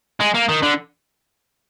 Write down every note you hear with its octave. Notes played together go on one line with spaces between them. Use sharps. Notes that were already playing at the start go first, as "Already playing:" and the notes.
G#3
A#3
D#3
D3